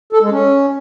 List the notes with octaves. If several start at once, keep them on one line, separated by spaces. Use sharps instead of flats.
A4
G#3
C#4